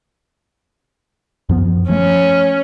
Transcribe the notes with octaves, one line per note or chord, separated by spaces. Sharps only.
F#2 F3 B3
F3 A3 C#4